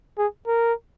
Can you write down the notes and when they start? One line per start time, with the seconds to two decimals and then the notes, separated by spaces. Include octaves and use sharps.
0.18 G#4
0.47 A#4